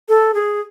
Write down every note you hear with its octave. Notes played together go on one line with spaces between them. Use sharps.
A4
G#4